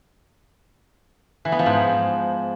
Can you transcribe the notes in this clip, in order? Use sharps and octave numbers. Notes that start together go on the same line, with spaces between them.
E3
B3
F3
G#2